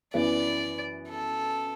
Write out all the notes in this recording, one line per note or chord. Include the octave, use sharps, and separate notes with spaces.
F#2 E3 B3 E4 B4 D5
A4